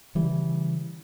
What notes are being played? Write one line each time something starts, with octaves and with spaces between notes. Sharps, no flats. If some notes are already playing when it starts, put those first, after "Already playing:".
C#3 E3 G3